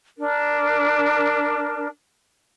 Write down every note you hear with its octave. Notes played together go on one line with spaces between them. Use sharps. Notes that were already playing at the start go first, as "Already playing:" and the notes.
D4 A#4